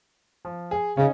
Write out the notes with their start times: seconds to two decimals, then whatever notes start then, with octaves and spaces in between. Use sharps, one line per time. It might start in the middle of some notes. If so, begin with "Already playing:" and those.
0.45 F3
0.71 G#4
0.97 C#3 C#4 D#4